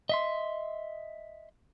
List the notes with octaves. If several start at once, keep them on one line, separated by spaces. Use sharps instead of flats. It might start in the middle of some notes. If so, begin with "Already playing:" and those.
D#5 E5 C6